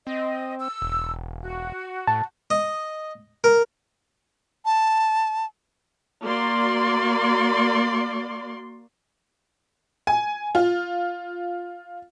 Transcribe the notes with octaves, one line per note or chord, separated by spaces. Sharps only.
C4 D#5
E6
E1
F#4
A2 A5
D#5
A#4
A5
A#3 F#4 D5 C6
G#5
F4